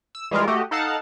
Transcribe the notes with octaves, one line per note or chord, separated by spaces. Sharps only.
E6
E3 G3 G#3 F4 A#4
A3 F#4 G4 D#5
D#4 A4 F5 F#5 A5